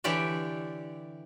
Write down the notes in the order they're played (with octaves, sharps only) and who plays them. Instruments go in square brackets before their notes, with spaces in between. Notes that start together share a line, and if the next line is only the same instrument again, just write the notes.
[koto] D3 E3 G4 C#5 D5 E5